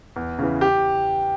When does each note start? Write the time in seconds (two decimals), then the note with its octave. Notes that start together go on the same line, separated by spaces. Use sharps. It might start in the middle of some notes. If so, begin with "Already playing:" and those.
0.16 E2
0.39 C#3 E3
0.61 G4